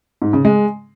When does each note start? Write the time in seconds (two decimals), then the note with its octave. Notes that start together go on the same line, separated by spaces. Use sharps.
0.22 G#2
0.33 C#3
0.45 G#3